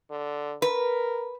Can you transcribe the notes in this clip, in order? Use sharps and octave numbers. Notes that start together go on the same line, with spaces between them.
D3
A#4 B4